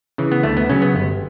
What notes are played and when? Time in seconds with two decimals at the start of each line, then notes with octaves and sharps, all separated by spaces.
0.18 C#3 E3
0.32 B3
0.43 D2 A3
0.57 B3
0.69 C#3 F#3 C#4
0.82 B3
0.94 G1